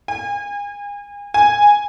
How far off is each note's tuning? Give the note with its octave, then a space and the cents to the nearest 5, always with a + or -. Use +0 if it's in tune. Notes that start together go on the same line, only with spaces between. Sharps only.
G#5 -35
G#5 -10